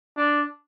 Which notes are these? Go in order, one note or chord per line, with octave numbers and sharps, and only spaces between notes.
D4